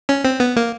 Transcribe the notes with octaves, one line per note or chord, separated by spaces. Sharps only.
C#4
C4
B3
A#3